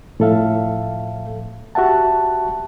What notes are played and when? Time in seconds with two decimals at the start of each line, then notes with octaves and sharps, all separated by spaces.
0.20 A2 F3 A4 E5 F5
1.75 F#4 G4 E5 F#5 A5